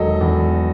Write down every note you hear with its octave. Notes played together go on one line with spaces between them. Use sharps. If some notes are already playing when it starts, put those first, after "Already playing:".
Already playing: E1 D#3 F#3 A4 D#5
E2